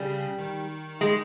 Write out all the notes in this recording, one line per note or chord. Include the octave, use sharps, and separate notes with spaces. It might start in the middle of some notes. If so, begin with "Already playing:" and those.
Already playing: C#3 G3
D#3
G#3